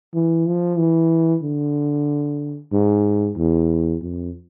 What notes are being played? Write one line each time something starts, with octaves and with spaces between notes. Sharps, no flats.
E3
F3
E3
D3
G#2
E2
F2